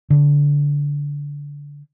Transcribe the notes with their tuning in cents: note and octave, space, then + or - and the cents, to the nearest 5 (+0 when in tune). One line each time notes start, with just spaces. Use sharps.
D3 -20